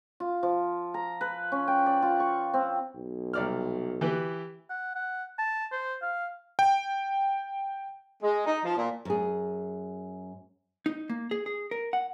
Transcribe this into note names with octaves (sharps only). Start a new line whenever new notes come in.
F4
F3
A#5
B4
C#4
G5
D5
F4
C#6
C4
B1
C2 D5 F6
E3 G4 B4
F#5
F#5
A5
C5
F5
G5
G#3
D#4
F3
A#2
F#2 G#4
D#4
A#3
G#4
G#4
A#4
F#5